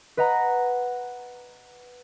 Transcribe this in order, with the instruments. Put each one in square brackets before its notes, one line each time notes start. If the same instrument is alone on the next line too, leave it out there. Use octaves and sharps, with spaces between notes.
[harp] B4 D#5 F#5 A#5